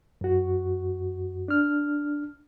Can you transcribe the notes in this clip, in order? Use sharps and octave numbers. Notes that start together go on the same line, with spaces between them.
F#2 F#4
D4 F6